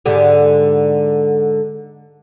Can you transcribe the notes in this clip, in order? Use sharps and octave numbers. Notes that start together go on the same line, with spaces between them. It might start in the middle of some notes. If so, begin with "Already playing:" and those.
G#2 D3 G4